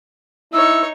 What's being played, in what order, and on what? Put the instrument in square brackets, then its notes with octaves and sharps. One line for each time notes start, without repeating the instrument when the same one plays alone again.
[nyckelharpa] D#4 C#5 [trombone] E4 [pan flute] E6